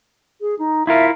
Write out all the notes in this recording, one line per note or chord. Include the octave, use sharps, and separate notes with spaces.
G#4
D#4
E4 F4 A#4 E5